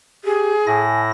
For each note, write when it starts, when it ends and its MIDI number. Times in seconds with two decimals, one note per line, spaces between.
0.24 0.53 67
0.24 0.81 68
0.67 1.11 45
0.67 1.11 64
0.67 1.01 80
0.67 1.11 94